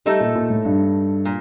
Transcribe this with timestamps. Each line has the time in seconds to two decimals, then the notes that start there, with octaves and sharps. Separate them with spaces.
0.06 G3 A3 D#4 A4
0.20 A#2
0.35 A#2
0.50 A2
0.65 G2
1.25 A#2